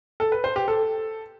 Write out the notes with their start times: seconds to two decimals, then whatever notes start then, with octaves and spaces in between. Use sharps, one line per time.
0.20 A4
0.32 B4
0.44 C5
0.56 G4
0.68 A4